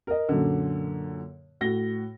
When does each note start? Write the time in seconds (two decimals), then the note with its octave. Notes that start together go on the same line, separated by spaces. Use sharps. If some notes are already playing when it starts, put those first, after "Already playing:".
0.07 A#4 D#5
0.29 F#2 A#2 D3
1.61 A2 F#4 A#6 G7